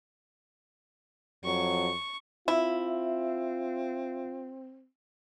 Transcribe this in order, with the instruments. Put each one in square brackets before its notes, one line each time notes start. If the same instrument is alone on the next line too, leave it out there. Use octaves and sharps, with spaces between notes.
[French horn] F2 [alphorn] F#3 [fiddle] C#6
[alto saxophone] C4 [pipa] E4 [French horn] F4 [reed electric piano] E5